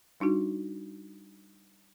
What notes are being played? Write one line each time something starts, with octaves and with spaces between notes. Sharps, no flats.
G3 D4 D#4 F#4